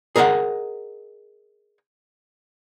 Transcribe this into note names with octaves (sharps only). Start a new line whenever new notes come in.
G#4 A#4 D#5 E5 F#5